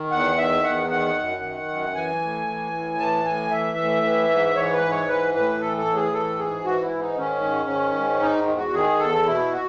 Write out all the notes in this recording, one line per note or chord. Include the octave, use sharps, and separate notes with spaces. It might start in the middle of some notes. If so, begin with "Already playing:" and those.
Already playing: D#3
E2 F#5
D#3 E5
E2 F#5
D#3 F#5
F#2
D#3
F#2
E3 G#5
A2
E3
A2
E3 A5
A2 G#5
E3 E5
A2
E3
G#2
E3 C#5
B4
G#2
C#5
E3 B4
A2 B4
E3 A4
A4
A2
G#4
E3 A4
G#2 G#4
E3 F#4
E4
G#2
D#4
D#3 C#4
G#2
D#3
G#2
D#3 D#4
E2
F#4
D#3 G#4
E2 A4
B2 E4
F#4